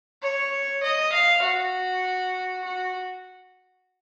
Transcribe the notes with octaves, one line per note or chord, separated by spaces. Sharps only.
C#5
D#5
F5
F#4
F#4